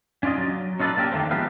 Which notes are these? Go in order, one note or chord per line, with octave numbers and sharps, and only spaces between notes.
C#4 D4 F4 D5 D#5
F#3
C#4 D#4 F4 A4 B4 D5
A#3 D4 G4 A4 A#4
D3 D#3 A3 A#3 C4
F3 G#3 B3 G4 B4 F5